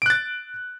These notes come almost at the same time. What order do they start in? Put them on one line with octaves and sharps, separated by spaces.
D7 F#6 A6